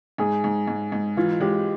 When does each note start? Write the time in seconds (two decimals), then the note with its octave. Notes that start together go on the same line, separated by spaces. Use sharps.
0.18 G#2 G#4
0.44 G#2
0.67 G#2
0.92 G#2
1.17 E3 F4
1.40 G#3 G4